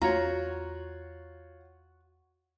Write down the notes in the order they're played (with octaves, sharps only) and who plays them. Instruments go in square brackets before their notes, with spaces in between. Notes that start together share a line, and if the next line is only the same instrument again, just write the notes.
[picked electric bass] E2 A3 [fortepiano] F4 C#5 [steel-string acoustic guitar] F#4 [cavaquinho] A#5